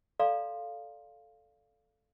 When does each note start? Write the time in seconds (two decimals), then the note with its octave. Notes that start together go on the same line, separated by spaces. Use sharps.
0.20 A4 D5 F5 A#5 C6